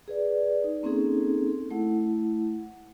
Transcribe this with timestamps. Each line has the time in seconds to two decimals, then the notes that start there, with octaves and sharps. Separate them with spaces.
0.08 G#4 B4 D5
0.64 D#4
0.83 A#3 C4 C#4 D#4 G#4 A4
1.48 A4
1.71 A3 E4 F#5